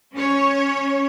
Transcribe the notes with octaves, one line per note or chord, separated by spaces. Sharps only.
C#4 C#5